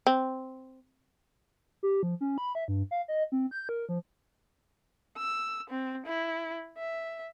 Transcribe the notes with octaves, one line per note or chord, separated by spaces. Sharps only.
C4
G4
F3
C#4
B5
E5
G2
F5
D#5
C4
G6
A#4
F3
E6
C4
E4
E5